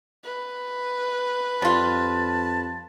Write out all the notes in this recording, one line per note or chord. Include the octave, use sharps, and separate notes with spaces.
B4
F2 G3 F4 A5